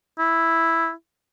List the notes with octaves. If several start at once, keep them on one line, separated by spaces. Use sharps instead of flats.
E4